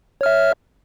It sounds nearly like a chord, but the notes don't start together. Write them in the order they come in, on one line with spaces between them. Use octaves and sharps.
C#5 F6 E5